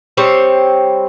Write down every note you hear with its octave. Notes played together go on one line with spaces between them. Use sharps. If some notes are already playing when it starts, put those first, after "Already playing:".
G3 C4 C5 C#5